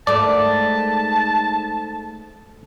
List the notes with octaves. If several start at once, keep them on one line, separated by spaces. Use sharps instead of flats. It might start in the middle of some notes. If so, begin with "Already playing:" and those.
G#2 A3 A#3 D5 A5